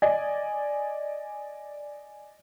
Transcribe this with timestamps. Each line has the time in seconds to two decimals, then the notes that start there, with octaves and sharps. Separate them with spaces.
0.02 D5 D#5 G#5